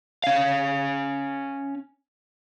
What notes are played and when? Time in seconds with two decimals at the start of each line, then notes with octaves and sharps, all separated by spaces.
0.24 C#4 F5